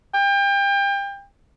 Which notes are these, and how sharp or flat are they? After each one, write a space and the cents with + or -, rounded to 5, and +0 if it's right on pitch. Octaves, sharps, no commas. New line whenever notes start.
G5 +30